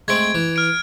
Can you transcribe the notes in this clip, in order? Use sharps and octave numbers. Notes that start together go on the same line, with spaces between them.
G#3 A3 C4 G#6 D7
E3
F6 D7